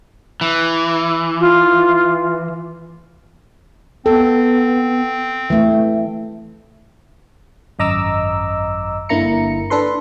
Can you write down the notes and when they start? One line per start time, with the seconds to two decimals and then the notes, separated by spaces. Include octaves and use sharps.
0.41 E3
1.40 F4
4.06 B3 C4 A4
5.50 E3 A3 E5
7.79 G#1 F#2 D#5 A#5 D6 E6
9.09 G1 D3 A#3 E4 A#5 C#7
9.70 D4 A4 B4 C6